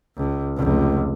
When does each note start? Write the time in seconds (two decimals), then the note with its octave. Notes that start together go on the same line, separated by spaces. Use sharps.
0.16 C#2
0.57 F1 C#2